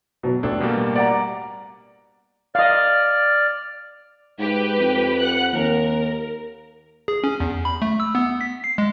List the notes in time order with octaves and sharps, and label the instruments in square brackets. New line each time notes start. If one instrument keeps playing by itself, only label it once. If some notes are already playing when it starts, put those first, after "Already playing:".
[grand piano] B2 F#3
[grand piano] A1 [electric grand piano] D4 A4 A5
[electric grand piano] B2 G3 A#3
[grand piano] D5 F#5 A#5
[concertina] D5 F6 [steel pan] D#5 F5
[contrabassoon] G#2 [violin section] G4 B4
[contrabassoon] F2
[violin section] F#5 F#6
[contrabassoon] D#2 [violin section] A#4
[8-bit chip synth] G#4
C#4
E2
B5
A3
E6
B3
B6
C7
G#3